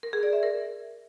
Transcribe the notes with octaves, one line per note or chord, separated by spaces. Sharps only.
A#4
G#4
D5
E5
A#4